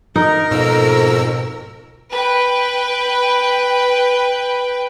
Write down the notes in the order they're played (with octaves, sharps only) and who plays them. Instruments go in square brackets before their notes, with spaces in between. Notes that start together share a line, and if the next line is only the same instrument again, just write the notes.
[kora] D#4 [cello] A#4
[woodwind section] F2 [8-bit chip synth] G#2 B2 E6
[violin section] B4 G5